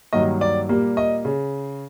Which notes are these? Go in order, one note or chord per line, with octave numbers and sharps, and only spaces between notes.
G2 D#3 F#3 A#3 D#5
D5
A#2 G3 A#3
D#5
C#3